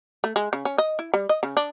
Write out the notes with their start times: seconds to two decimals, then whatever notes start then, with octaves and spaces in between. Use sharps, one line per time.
0.24 A3
0.36 G#3
0.53 C#3
0.65 C#4
0.78 D#5
0.99 E4
1.14 G3
1.29 D#5
1.43 C#3
1.57 D4